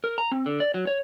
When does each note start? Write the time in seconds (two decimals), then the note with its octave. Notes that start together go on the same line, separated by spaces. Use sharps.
0.04 A#4
0.18 A#5
0.32 C4
0.46 D3
0.60 D5
0.74 F#3
0.87 C#5